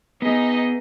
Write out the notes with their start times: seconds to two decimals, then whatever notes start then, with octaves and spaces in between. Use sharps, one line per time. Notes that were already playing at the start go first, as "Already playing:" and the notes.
0.22 B3 D#4 G#4 D#5